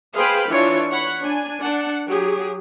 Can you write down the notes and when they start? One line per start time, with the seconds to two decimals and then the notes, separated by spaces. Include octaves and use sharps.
0.15 G#4 B4 C5 F5 G5 B5
0.49 E3 D4 F4 C#5
0.90 C#5 F#5 B5
1.22 D4 G#5
1.62 D4 F#5 A5
2.10 F#3 G4 G#4